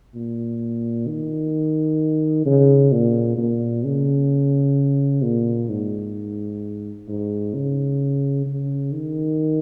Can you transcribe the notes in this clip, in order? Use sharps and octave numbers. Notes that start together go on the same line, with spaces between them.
A#2
D#3
C#3
A#2
A#2
C#3
A#2
G#2
G#2
C#3
C#3
D#3